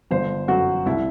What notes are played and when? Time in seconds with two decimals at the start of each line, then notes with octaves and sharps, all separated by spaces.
0.11 G1 C5
0.48 F#2 F#3 F#4
0.86 C2 E4